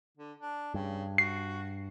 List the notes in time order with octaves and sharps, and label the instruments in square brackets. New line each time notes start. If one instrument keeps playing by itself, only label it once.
[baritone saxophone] D3
D4
[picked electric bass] G2 [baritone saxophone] C#3
[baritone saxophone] F#4 [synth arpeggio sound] C7